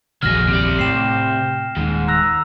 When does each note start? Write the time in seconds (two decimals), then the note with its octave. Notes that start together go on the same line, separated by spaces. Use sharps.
0.22 D#1 A#1 F2 F#3 G#4 F6 A#6
0.49 C3 G4 D5
0.79 A2 G5 C7 E7
1.76 D#1 D#2 G#2
2.08 A#5 E6 F#6